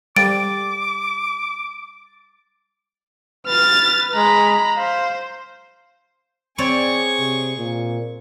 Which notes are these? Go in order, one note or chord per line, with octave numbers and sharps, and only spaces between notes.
G3 D6 A6 D7
B4 F6 A6
G#3 A#5 B5
C5 F5
C4 G#4 C#5 D5 C#6
C3
A#2